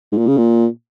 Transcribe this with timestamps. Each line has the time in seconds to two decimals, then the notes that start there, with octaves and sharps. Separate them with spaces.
0.12 G#2
0.18 A#2
0.27 C#3
0.38 A#2